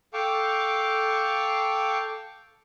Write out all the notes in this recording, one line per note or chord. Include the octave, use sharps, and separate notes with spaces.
A4 F5 G5 A5 C#6 D6